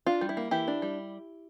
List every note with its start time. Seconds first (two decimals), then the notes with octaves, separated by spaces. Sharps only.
0.06 D4 F4
0.21 G3
0.29 E4
0.37 A#3
0.51 E3 E4 G4
0.68 D4
0.82 G3